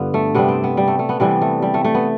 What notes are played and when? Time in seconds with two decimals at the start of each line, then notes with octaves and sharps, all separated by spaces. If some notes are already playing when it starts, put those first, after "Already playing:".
Already playing: G2 D3 B3 F4
0.14 A3
0.35 C3 G3 B3
0.48 C4
0.64 B3
0.77 G3
0.87 A3
0.99 A3
1.09 B3
1.20 C3 E3 G3 B3
1.41 A3
1.62 G3
1.74 A3
1.84 A3
1.94 B3